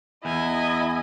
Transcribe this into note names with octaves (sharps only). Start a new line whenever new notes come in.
E2 E4 D#5 G#5